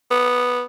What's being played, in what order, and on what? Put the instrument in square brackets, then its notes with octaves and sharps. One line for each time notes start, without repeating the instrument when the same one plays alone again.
[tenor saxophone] B3